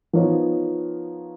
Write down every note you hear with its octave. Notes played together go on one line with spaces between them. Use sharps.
F3 B3 D#4 A#4 C#5